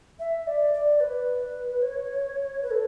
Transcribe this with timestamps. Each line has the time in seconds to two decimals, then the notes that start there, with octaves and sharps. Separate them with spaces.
0.19 E5
0.47 D5
0.74 D5
1.00 B4
1.82 C#5
2.63 B4
2.71 A4